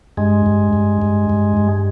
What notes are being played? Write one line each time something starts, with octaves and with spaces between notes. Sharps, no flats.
G2 G#3
G2
G2
G2
G2
G2